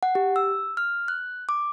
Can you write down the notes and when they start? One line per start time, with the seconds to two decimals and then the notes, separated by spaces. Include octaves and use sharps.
0.03 F#5
0.15 G4
0.36 E6
0.77 F6
1.08 F#6
1.49 D6